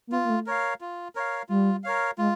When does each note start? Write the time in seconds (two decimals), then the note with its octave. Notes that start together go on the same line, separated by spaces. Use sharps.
0.07 A#3
0.12 B3 F4
0.25 A#3
0.30 A3
0.46 A#4 C#5 F5
0.81 F4
1.15 A#4 C#5 F5
1.49 G3 F4
1.84 A#4 C#5 F5
2.17 G#3 F4